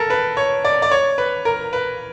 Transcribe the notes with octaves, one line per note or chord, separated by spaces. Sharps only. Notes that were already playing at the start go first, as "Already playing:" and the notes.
Already playing: A4 A#4
B4
C#5
D5
D5
C#5
B4
A#4
B4